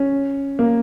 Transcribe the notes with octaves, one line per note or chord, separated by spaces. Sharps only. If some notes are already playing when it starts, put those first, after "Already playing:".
Already playing: C#4
A#3